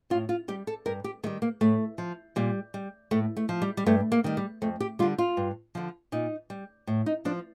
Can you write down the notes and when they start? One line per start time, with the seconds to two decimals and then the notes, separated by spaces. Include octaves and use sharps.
0.10 A2 F4
0.29 F4
0.48 G3 G4
0.67 A4
0.86 G2 A#4
1.04 G4
1.23 D#3 A3
1.26 G3
1.42 A#3
1.61 A2 A3
1.98 F3
2.36 A#2 G3
2.74 G3
3.11 A2 A3
3.37 A3
3.49 F3
3.62 G3
3.77 G3
3.86 G2 A3
4.12 A#3
4.24 D#3 G3
4.37 G3
4.62 F2 A3
4.80 G4
4.99 D3 G3 F4
5.18 F4
5.37 G2
5.75 D3 F3
6.12 A#2 D#4
6.50 G3
6.87 A2
7.06 D#4
7.25 F3 D4